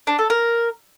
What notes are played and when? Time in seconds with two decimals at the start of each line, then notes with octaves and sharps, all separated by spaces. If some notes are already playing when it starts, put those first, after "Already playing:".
0.07 D4
0.19 A4
0.30 A#4